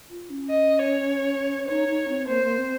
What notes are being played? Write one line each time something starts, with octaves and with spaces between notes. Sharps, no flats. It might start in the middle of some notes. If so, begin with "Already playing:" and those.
F4
C#4
D#5
C#5
D#4 C#5
D#4
C4
A#3 C5
A#3
C4